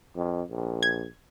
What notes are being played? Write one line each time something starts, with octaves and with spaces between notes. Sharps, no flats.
F2
A#1
G#6